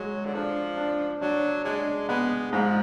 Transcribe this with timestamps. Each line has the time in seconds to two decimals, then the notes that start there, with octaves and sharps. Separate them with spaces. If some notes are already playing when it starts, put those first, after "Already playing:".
Already playing: F#3 G#3
0.25 D3
0.34 F3 D4
0.77 D4
1.21 F#3 D4
1.64 G#3 D4
2.08 G#3 B3
2.52 G#2 F3